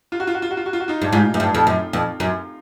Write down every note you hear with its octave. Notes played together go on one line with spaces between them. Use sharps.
F4
F#4
F4
F#4
F4
F#4
F4
F#4
F4
F#4
D#4 F4
G2
G#2 D#4 F4
F#2
G2
F2
F#2
F2
F#2